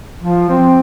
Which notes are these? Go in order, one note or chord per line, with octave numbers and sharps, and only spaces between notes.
F3
C4